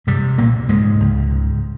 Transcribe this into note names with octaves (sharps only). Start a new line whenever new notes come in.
G2 C3 G3
C2 A#2 A#3
G#2 C#3 G#3
C#2
G#2